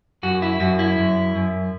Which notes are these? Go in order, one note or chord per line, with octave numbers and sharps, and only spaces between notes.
F#2 F#4
E4
F#2 F#4
E4
F#2
F#2